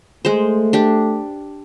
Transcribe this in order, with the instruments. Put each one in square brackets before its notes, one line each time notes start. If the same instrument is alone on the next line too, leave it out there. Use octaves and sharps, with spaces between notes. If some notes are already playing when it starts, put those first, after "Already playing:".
[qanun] G#3 C5 [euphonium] A3
[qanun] D4 G4